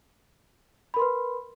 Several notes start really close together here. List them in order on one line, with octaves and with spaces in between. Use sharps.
B5 A#4 C6 B4